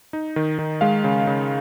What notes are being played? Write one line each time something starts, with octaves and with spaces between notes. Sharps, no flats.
D#4
D#3
D#3
G#3 F5
C#3
C#3